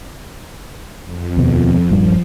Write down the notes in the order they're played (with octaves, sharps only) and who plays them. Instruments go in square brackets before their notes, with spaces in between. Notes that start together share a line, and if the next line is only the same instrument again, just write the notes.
[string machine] F2
[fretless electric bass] D#2 B2
[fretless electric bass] D#1 G2 G3 [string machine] F3